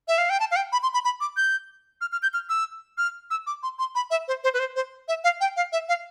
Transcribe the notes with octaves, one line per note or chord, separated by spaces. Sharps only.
E5
F5
G5
A5
F5
G5
B5
C6
B5
B5
D6
G6
F6
F6
G6
F6
E6
F6
E6
D6
C6
C6
B5
E5
C5
C5
B4
C5
C5
E5
F5
G5
F5
E5
F5